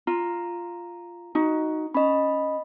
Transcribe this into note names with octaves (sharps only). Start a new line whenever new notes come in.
F4 A#5
D#4 F#4
C#4 D#5 B5